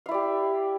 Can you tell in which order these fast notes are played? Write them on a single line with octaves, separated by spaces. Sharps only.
F5 E4 D5 G4